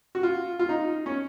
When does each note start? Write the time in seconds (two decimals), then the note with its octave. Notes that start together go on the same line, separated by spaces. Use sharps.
0.15 F#4
0.23 F4
0.59 F4
0.69 D#4
1.06 C#4